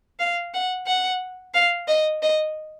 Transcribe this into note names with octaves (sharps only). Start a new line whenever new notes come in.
F5
F#5
F#5
F5
D#5
D#5